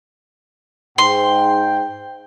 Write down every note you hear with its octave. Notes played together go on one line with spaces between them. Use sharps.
G#2 G5 C6